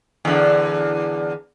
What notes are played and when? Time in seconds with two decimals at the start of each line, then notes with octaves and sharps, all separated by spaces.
0.25 E2 D3